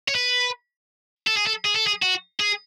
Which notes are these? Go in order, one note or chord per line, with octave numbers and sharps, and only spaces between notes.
C#5
B4
A4
G#4
A4
G#4
A4
G#4
F#4
G#4